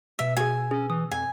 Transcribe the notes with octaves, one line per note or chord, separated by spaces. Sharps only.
B2 E5 E6
F#4 G#4 G#5
C#4 G#4
E3 D#6
F2 G#5